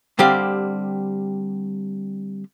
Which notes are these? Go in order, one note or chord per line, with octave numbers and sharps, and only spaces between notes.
D3 G3 C4 G4 F5